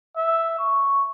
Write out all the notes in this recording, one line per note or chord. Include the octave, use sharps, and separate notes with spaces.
E5
C#6